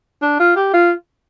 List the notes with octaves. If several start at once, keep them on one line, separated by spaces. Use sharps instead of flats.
D4
F4
G4
F4